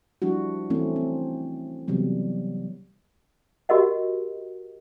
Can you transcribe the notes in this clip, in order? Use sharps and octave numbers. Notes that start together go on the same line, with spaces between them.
F3 G3 D4 E4 F#4
E3 A3 C4 C#4 E4
C4
C3 E3 F#3 G3 B3
F#4 G4 A#4 D#5 F#5